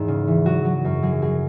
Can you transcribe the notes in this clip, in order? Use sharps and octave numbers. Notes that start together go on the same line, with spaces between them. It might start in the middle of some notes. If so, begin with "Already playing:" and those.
Already playing: E2 G#2 G#4
C#3
E3
F#3 F#4
F#3
F#2
F#3 G#4
F#3 G#4